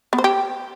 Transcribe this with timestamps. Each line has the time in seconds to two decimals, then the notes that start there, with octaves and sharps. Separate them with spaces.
0.13 B3
0.18 C5
0.24 G4